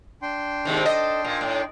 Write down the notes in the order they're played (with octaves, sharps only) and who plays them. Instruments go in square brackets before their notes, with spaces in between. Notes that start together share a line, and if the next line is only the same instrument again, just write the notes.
[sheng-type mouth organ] D4 G5 C6
[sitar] G#2 C3 D#3
A4 D#5
A#2
A2